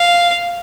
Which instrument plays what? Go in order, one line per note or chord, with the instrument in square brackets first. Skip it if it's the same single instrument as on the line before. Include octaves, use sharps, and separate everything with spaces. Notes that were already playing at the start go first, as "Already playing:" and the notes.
Already playing: [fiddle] F5